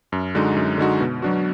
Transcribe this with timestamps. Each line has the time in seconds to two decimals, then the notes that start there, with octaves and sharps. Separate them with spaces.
0.12 F#2
0.35 D3 G#3 D#4 F#4
0.56 F#2
0.78 D3 G#3 D#4 F#4
1.01 B2
1.22 F#3 D4 F#4